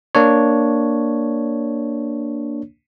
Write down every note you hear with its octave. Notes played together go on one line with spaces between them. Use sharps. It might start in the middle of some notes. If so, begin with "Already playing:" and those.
A#3 D4 C#5